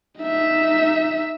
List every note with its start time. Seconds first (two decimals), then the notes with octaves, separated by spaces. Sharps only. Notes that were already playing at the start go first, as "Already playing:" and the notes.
0.20 D#4 E5